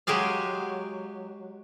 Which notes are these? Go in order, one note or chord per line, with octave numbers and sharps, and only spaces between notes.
F#3 G#3 G4 G#4 F5